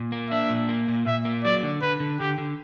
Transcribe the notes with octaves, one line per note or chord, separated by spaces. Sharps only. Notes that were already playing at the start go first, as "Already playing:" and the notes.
Already playing: A#2
A#3
D4 E5
A#2
A#3
A#2
A#2 E5
A#3
F#3 D5
D3
D3 B4
D3
D3 G4
D3